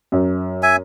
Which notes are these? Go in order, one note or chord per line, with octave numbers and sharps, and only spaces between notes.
F#2
E5 G#5